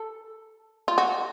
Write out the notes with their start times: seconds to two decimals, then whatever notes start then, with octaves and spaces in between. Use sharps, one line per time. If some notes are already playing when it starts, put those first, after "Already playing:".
Already playing: A4
0.88 F4
0.98 F#4